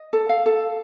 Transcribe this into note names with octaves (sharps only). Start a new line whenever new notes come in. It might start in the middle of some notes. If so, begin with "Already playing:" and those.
Already playing: D#5
A4
F5
A4